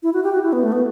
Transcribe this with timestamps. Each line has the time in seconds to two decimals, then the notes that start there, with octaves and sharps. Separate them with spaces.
0.03 E4
0.13 F#4
0.23 G4
0.32 F#4
0.43 E4
0.53 B3
0.63 A3
0.72 B3